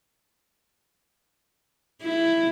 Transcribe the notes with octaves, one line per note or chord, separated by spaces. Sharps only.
E4